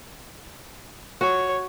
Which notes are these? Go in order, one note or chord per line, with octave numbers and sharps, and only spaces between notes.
F#4 C#5